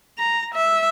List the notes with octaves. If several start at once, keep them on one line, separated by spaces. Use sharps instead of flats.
A#5
E5